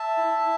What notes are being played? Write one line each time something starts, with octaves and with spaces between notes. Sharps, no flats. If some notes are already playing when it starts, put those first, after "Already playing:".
Already playing: E5 A5
E4